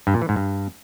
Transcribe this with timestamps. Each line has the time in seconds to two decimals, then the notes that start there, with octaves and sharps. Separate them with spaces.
0.07 G2
0.14 A#2
0.22 E3
0.29 G#2
0.36 G2